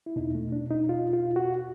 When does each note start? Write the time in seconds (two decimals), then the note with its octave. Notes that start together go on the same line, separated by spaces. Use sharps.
0.06 E4
0.16 E2 B2 D#4
0.35 A3
0.52 D4
0.70 D#4
0.89 F4
1.13 F4
1.36 F#4